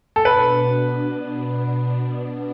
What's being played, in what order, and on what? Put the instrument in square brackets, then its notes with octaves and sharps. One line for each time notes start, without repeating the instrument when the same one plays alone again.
[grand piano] A4
[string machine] B2 B3 D4 [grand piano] B4